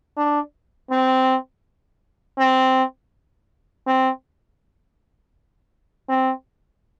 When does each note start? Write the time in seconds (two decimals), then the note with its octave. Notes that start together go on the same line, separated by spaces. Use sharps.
0.17 D4
0.91 C4
2.39 C4
3.87 C4
6.09 C4